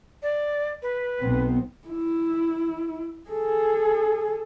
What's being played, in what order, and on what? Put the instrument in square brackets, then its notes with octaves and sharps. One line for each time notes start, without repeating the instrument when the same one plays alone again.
[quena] D5
B4
[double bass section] B1 B3 C4
[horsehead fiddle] E4
G#4 A4